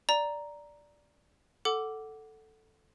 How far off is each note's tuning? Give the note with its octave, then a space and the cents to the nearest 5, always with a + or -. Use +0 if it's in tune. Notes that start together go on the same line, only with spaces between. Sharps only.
D5 +0 A#5 +0
A4 +0 F#5 +5 D6 -5